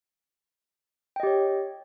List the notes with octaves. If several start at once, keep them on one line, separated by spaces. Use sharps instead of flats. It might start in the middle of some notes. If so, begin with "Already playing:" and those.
G4 C#5 D#5 G5